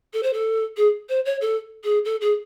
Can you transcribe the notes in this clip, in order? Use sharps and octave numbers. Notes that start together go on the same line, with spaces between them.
A4
C5
A4
G#4
C5
C#5
A4
G#4
A4
G#4